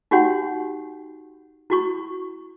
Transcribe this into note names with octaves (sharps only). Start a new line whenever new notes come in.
D#4 F#4 G4 C#5 F#5 G5
E4 F#4 C#6